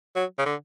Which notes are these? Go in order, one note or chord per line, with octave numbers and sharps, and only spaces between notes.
F#3
C#3
D3